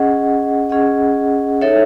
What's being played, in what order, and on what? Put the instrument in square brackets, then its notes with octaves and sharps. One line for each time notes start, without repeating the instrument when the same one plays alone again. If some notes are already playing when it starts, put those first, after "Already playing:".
Already playing: [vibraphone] C#4 G#4 D#5 F#5
C#4 G#4 D#5 F#5
D#4 A4 C#5 E5